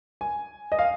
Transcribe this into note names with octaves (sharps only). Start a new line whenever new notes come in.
G#5
D#5
F5